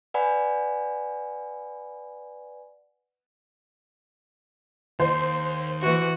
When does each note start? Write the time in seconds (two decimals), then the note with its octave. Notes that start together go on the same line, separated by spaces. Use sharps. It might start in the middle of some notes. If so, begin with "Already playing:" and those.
0.14 B4 D5 F#5 G#5 B5
5.00 D#2 C5
5.82 E3 F#4